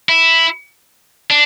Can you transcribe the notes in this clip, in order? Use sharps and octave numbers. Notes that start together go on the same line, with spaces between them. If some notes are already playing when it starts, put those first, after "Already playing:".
E4
D4